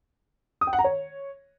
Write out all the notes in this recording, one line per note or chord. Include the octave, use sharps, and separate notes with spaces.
D#6
G5
F#5
A#5
C#5